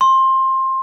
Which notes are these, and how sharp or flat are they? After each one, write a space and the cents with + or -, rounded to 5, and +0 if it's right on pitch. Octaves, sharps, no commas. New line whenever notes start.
C6 +20